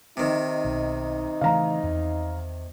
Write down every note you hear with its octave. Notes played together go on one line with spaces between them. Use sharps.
C3 D#3 D#4
B1
C#3 E3 A3 F5 A#5
E2